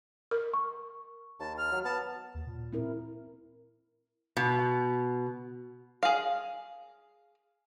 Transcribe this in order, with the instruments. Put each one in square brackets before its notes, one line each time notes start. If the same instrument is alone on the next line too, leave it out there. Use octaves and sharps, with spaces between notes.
[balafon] A#4
[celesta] C#6
[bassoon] D#2 [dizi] A5
[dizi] F6
[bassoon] F#3
[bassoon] B3 [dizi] A5
[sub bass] D#2
A#2
[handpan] C4 E4 A#4
[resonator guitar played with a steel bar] B2
[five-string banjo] G#4 F5